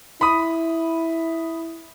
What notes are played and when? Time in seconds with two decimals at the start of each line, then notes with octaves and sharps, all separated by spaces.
0.21 E4 B5 D#6